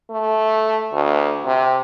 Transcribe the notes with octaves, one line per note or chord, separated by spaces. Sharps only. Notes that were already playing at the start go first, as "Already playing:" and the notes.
A3
D2
C3